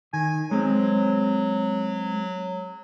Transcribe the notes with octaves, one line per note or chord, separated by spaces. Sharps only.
D#3 G#5
F#3 G#3 C4